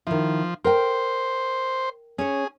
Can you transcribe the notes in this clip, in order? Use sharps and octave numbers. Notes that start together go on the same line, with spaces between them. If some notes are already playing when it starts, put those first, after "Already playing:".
D#3 F3 E4
A#4 C5 G5
C#4 G#4 C#5